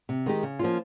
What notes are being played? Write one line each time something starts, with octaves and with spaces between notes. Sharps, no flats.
C3
D#3 G#3 D#4 G4
C#3
F3 A#3 C#4 F4